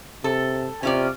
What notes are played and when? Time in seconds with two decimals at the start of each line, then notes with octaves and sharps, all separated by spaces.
0.24 C3 A4
0.83 C3 C#4 F4 D5